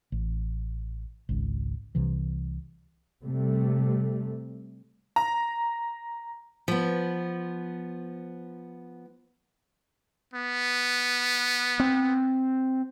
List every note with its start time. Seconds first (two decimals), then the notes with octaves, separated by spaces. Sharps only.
0.12 A1
1.29 G#1 C#2
1.95 C2 C3 E3
3.23 C3 G3 A3
5.16 A#5
6.68 F3 B3
10.34 B3
11.80 C4